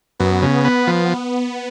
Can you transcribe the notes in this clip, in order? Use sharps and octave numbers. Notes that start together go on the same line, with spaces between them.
F#2 B3
C#3
B3
F3